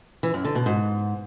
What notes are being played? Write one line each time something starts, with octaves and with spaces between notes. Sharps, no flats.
E3
F#2
D3
B2
G#2